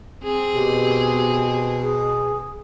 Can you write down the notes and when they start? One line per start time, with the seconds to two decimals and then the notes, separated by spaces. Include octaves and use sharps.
0.24 C4 G#4
0.54 B2 G4
1.82 G#4